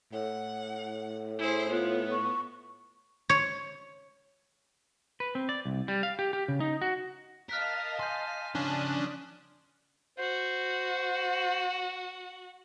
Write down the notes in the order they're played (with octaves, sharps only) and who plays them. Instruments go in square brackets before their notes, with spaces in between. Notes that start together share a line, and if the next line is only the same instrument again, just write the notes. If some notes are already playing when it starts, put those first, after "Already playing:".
[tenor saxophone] A2 [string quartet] F#5
[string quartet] E4 G#4 C5
[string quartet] B3 [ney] F4
[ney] C#6
[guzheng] C#5
[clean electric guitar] B4
C4
D5
C2
G3
F5
G4
G4
C#3
D#4
F#4
[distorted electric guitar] A#4 [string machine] D#5 F5 A5 [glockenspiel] F6 F#6 B6
[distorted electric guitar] G#5 [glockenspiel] C6 G6
[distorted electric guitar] C#3 F3 [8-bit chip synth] C#4 D4 [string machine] D5 D#6 F#6
[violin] F#4 [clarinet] C5